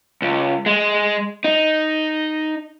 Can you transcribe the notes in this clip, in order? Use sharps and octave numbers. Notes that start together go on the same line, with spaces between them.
C#2
G#3
D#4